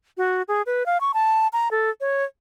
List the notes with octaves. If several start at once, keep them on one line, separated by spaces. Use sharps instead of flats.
F#4
G#4
B4
F5
C#6
A5
A#5
A4
C#5